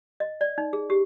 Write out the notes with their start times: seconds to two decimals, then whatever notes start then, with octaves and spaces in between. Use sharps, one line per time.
0.20 D#5
0.41 D5
0.58 D#4
0.73 G#4
0.90 G4